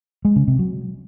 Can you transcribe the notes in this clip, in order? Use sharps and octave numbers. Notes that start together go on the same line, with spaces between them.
G#3
C#3
C3
F#3